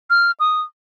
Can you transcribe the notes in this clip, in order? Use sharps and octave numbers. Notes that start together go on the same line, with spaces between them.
F6
D#6